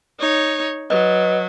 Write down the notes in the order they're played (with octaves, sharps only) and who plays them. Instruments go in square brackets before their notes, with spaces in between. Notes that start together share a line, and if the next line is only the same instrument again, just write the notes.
[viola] D#4 C#5
[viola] F#3 [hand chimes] B4 D#5